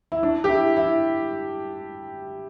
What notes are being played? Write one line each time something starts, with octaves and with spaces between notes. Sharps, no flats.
E4
D4
G4
E4
E4